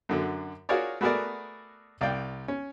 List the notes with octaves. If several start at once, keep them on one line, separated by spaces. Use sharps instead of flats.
F#2 D3 F#3
F4 F#4 G#4 A#4 C#5 D5
A3 B3 F#4 G#4 A#4 D5
C2 D5 F5 G5
C#4